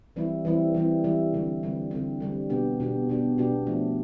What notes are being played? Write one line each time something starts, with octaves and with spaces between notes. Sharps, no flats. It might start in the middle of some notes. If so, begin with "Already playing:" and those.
E3 G3 C4 E4
E3 G3 C4 E4
E3 G3 C4 E4
E3 G3 C4 E4
D3 G3 C4
D3 G3 C4
D3 G3 C4
D3 G3 C4
B2 B3 D4 G4
B2 B3 D4 G4
B2 B3 D4 G4
B2 B3 D4 G4
F3 A3 D4